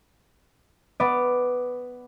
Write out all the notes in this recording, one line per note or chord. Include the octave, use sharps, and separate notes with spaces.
B3 D5